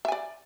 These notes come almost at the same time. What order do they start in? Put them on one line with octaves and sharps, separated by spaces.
E5 G#5 D5